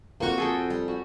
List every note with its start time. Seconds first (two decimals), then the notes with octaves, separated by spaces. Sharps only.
0.20 F2 A#3 C4 F#4 C#6
0.38 F2 G#4 A4 G5
0.70 G3
0.88 F#4